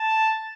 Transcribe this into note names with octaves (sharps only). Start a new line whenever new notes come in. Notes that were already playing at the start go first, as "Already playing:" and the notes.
Already playing: A5